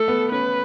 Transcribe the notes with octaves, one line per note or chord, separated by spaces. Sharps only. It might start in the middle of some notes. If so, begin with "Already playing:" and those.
Already playing: A3 A4
B3
C#4 B4